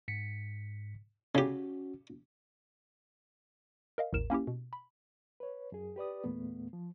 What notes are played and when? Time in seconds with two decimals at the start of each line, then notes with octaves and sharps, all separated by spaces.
0.08 G#2 B6 C#7
1.35 C#3 C#4 F#4 G4
3.98 A#4 D#5 F5
4.13 A1 D#2 A2 A#4 E7
4.30 A#3 C#4 E4 G4
4.47 B2
4.73 B5
5.40 B4 C#5
5.72 F#2 G#4
5.96 G4 B4 D5 D#6
6.24 E2 A#2 A3 B3
6.73 F3